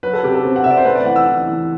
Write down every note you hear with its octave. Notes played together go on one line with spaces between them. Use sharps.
F#3 B4
A4
C3 G4
A4
C4
F#5
C3 E5
D5
C5
A3 B4
D5
E3 F#5
E6
E3
E3